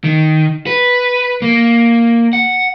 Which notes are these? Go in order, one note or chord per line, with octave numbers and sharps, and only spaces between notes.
D#3
B4
A#3
F#5